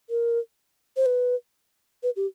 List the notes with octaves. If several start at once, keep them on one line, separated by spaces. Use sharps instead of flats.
A#4
C5
B4
B4
G4